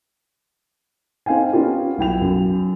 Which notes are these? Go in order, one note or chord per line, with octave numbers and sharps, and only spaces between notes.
C4 D#4 F5 G5 G#5
B3 C#4 F4 G4 A#4
B1 E4 G5 F7
F#2